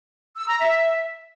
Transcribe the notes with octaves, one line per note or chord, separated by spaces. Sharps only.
E6
A#5
E5